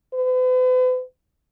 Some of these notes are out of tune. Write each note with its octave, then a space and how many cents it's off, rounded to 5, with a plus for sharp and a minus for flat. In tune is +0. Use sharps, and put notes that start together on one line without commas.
B4 +45